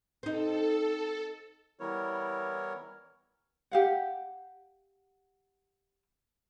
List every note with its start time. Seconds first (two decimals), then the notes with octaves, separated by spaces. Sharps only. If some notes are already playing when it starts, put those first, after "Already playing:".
0.23 C4 D#4 A4
1.79 E3 G3 B3 E4 A#4 C#5
3.71 G4 F5 F#5